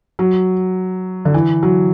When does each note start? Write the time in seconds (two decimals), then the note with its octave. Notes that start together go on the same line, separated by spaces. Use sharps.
0.19 F#3
1.25 D3
1.34 E3
1.63 F#3